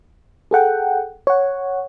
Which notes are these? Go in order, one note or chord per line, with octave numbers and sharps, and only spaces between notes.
G#4 A4 F#5 G5
C#5 F#5